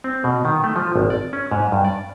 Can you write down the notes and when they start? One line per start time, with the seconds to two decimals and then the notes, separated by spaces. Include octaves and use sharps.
0.04 C4
0.24 B2
0.45 D#3
0.64 A3
0.76 F3
0.96 G#1
1.10 D5
1.33 C#4
1.52 G#2
1.72 G2
1.85 D5